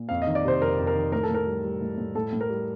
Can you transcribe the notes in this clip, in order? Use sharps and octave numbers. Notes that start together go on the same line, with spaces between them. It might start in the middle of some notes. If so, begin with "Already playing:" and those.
Already playing: A#2
F2 F5
D#5
D#3
D5
C3 C5
F2 A#4
F2
A#4
D#3
A2 A#4
A4
A2 A#4
G3
G3
A2
A2
A2 A4
A2
A#4
G3